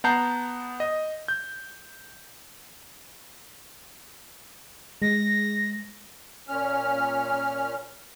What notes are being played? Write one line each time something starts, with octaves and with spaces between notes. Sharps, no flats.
B3 F#5 A5 A#5 G6 C7
D#5
G6
G#3 A#6
A#2 C#4 F6